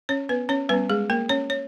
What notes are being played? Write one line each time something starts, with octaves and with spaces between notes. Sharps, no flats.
C#4 C#5
B3 B4
C#4 C#5
G3 B3 C#4 B4
G#3 G#4
A#3 A#4
C#4 C#5
C#5